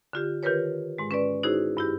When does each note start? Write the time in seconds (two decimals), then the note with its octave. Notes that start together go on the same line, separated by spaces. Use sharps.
0.13 D3 F4 G4
0.43 D#3 F4 G4 A#4 B4 C#5
0.98 G#2 G#3
1.11 C#4 B4 D5
1.43 D#4 E4 F#4 G#4 C5
1.77 G2 E4 G4